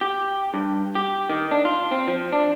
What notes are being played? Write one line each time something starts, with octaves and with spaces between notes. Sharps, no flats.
G4
G2
G4
D#3
D4
F4
C4
F3
D4